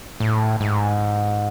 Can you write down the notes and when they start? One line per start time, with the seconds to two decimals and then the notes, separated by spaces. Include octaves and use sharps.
0.20 A2
0.60 G#2